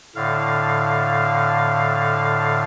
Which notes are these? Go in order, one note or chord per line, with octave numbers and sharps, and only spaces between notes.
A2 D3 F5